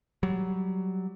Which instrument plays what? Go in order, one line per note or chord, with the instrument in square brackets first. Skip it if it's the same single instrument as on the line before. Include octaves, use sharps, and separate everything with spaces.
[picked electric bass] F#3 G3